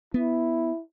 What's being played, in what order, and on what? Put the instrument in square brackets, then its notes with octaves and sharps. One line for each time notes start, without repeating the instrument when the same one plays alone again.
[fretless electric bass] B3 [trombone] E4